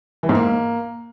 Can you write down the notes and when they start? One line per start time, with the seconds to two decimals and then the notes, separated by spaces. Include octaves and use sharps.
0.23 E3
0.29 G#2
0.35 A#3